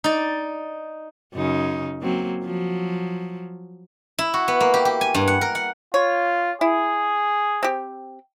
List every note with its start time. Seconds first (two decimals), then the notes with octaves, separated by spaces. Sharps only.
0.04 D#4 D5
1.34 F#2 C#3 D#4
2.02 F#3 A#3 C4
2.43 F3 F#3
4.19 E4
4.34 F#4
4.48 B3
4.60 A#3
4.74 G4
4.85 G4
5.01 G#5
5.14 G2
5.28 F#5
5.41 A#4
5.55 F#5
5.94 F4 C#5
6.61 E4 G#4
7.63 C4 G4